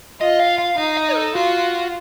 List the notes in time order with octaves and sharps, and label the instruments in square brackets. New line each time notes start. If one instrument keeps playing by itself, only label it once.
[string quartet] F4 [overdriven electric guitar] D#5
[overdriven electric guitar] F5
F5
[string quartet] D#4 [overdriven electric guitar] F5
[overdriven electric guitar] D#5
A4
[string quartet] F4 [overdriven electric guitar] F#4